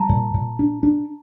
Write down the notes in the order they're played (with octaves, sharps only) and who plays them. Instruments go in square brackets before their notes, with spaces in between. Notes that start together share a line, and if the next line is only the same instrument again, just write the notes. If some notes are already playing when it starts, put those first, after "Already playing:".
Already playing: [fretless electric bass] G3 [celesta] A5 A#5
[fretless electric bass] A#2
A#2
D4
D4